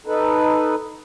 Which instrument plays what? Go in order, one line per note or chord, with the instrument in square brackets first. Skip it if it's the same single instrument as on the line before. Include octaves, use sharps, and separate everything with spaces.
[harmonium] D#4 A4 B4